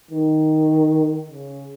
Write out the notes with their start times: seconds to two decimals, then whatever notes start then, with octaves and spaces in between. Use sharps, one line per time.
0.11 D#3
1.30 C#3